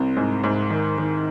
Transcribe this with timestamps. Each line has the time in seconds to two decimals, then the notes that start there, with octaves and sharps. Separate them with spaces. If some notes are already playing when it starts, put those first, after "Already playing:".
Already playing: C2 C4
0.16 G#2
0.44 G#2
0.70 D#3
0.98 D#3